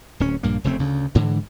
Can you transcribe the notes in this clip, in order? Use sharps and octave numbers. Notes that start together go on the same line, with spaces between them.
D1 C#4
A#1 G2 A#3
F1 C#3 A3 C4
D2 C#3
G#2 D3 E3